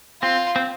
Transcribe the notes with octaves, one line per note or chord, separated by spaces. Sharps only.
C4 F4
C4